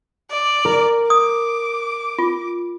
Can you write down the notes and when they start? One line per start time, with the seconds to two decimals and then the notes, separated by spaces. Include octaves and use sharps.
0.31 D5
0.65 A#4
1.10 D6 D#6
2.19 F4